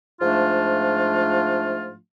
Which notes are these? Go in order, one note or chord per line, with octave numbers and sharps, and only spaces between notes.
G#2 F3 A3 D4 F4